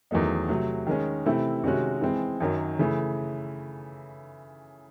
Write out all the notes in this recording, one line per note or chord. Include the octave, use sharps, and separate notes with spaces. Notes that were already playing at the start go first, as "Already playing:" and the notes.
E2 D#3 F#3 A3 D#4
C3 F#3 A3
D#3 G#3 C#4
C3 E3 A3 C4 E4
C3 D#3 G#3 C#4 F#4
E3 G#3 C4
F#2 D#3 F#3
C#3 E3 A3